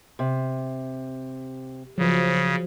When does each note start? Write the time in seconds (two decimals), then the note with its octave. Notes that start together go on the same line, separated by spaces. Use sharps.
0.19 C3
1.98 C#3 F3 F#3